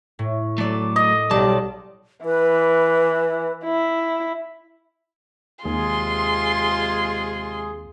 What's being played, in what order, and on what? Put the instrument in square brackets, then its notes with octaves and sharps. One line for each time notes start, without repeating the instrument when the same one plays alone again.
[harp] A2
[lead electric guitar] F#3 A3 [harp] A4 D5
[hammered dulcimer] D#5
[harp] B1 [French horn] G3 [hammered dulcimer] D5 [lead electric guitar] A5
[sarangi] E3 [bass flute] B4
[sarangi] E4
[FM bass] D#2 [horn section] C3 G#3 G#4 [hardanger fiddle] F4 [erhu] C6